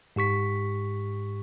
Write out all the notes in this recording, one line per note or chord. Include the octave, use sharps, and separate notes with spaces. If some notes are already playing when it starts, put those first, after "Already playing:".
G#2 G4 C#6 B6